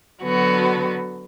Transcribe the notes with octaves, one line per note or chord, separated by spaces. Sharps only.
D3 F#3 B3 F#4